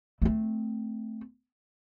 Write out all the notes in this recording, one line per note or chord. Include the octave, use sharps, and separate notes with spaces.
A3 C4